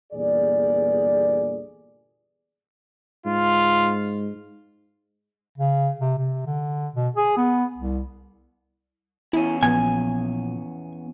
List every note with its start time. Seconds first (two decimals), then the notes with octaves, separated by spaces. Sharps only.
0.13 G1 E2 A#2 G#4 D5
3.26 G#2 F4
5.58 C#3
6.01 C3
6.18 C3
6.46 D3
6.95 B2
7.17 G#4
7.37 B3
7.78 C2
9.33 E2 C#4 E4
9.63 A#2 F3 B3 G#5